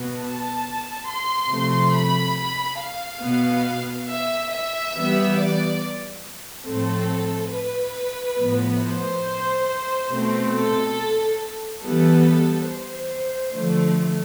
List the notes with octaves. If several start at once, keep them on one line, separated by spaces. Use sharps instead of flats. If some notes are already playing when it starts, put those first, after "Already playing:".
Already playing: B2 B3
A5
C6
C3 F3 A3
B5
F5
B2 B3
E5
E5
E3 G3 B3
D5
A2 F3 A3 C4 A4
B4
A2 F3 B3
C5
B2 A3 C4
A4
E3 G3 B3 A4
C5
D3 F3 A3